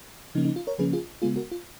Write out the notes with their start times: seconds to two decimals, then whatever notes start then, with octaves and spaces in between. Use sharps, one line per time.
0.35 C#3 F3 A#3 C#4 D#4
0.45 D#4
0.56 F4
0.67 A#4 C#5
0.78 C#3 F3 A#3 C#4 G#4 B4
0.93 F4 G#4
1.22 C#3 G#3 B3 F4 G#4
1.36 F#4 A#4
1.51 F4